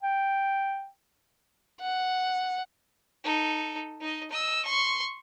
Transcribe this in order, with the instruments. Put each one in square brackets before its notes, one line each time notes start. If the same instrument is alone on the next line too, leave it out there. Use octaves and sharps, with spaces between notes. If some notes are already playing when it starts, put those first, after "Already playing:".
[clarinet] G5
[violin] F#5
[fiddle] D#4 A4
D#4 D#5
D#5 E6
C6 C#6